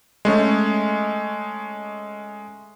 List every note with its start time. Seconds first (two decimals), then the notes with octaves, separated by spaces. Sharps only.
0.25 G#3 A3 C#4